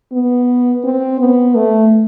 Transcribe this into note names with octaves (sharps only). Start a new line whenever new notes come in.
B3
C4
B3
A3